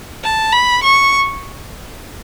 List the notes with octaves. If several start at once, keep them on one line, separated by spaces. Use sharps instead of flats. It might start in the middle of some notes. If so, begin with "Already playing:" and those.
A5
B5
C#6